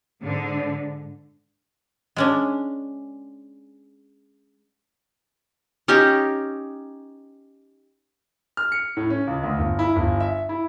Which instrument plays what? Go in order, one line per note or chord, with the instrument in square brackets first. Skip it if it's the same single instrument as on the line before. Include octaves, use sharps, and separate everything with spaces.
[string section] G#2 D3
[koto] G#3 C#4 D4
[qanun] C#4 D#4 G4 G5
[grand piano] F6
C#7
A2
C#4
C#2
D2
G1
E4
G1
E5
E4